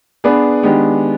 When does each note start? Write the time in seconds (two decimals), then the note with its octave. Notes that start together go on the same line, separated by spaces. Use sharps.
0.24 B3 D4 G#4 B4 D5
0.63 D#3 G#3 B3 D4 G4